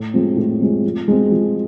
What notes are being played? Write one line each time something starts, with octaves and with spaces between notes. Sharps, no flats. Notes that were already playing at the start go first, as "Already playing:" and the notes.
Already playing: A2
F3 G#3 C4
A2
F3 G#3 C4
F3
G#3 C4
F3